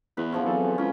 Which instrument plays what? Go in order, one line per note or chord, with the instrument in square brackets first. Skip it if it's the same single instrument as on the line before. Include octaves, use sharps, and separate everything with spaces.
[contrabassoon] E2 [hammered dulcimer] B4
[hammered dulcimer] D3 F3 C#4
[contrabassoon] E2 [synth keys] F#3 C4 A4
[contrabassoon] C#2 [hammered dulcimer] C#4